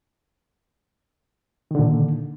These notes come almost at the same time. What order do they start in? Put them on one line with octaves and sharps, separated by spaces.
D#3 D3 A#2